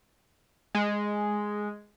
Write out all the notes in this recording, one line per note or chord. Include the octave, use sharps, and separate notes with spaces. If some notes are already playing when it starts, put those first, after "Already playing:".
G#3